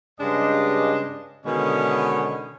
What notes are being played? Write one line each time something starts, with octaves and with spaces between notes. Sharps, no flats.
G2 C#3 G#3 D4 G4 D#5
B2 D3 D#3 G#3 B3 C#4